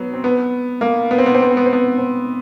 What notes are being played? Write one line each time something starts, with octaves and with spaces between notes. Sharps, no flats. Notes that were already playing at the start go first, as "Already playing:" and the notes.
Already playing: F#3 B3
C4
B3
A#3
B3
C4
B3
C4
B3
C4
B3
C4
B3
C4